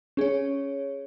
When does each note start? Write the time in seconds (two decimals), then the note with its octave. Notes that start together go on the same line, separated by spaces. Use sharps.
0.17 C#4 G#4 C#5